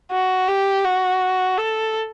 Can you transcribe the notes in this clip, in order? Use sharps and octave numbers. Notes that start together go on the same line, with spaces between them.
F#4
G4
F#4
A4